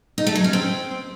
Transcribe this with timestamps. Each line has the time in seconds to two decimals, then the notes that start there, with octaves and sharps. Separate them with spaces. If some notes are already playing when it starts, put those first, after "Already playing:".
0.18 D#4
0.27 A3
0.35 F#3
0.44 C#4
0.53 C4